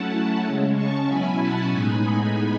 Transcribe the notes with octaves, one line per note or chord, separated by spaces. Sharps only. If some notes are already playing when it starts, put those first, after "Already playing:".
Already playing: F#3 A3 C#4 E4 F#5 A5
C#3 G#3 C#4
A5 C#6
B2 F#3 C#4 E4 G#5 B5
F#5 A5
A2 G#3 B3 D#4 G#5 B5
G#5 B5